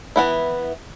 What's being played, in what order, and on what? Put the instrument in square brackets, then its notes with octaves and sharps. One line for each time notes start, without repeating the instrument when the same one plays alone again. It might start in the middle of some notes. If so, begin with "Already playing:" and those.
[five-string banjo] E3 B3 E4